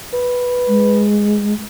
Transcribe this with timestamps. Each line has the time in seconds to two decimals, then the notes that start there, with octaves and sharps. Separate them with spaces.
0.14 B4
0.68 G#3